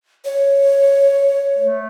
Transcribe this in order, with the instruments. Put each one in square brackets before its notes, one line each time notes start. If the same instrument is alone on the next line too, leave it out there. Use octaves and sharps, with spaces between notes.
[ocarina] C#5
[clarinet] A3